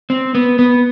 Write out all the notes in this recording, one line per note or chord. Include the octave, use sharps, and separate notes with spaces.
C4
B3
B3